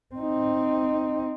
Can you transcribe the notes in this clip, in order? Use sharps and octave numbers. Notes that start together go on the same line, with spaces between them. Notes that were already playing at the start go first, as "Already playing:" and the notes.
C4 D#4